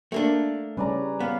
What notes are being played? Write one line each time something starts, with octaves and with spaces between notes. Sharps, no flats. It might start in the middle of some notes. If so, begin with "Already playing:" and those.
A3 A#3 D4
C#3 G3 C#4 B4 D5 A#5
B3 F5